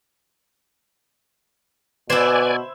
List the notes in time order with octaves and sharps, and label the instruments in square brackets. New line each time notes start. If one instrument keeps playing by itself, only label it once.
[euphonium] B2 [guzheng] E4 C5 [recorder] B4 [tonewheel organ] D5 G#5